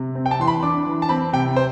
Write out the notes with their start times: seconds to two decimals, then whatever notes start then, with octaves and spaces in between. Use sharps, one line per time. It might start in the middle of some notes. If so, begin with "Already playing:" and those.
Already playing: C3
0.15 C4
0.26 G5
0.31 A5
0.39 E3 C6
0.47 B5
0.63 D4 D6
0.86 E3
1.02 A5
1.09 C4 B5
1.33 C3 G5
1.56 C5